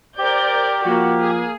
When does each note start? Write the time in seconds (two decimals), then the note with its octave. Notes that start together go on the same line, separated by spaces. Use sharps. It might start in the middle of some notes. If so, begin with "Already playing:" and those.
0.18 G4 A#4 C5 D5 G6
0.85 F3 A#3 F#4
1.20 G#4